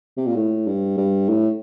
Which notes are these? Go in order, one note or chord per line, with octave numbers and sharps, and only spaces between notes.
C3
A#2
A2
G2
G2
A2